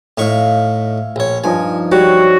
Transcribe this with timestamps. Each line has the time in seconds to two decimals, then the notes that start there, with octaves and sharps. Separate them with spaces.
0.18 A2 D#4 E5 F5 C#6
1.16 A#1 C#5
1.44 G2 F3 D#4 G#5
1.92 G3 F#4 C#5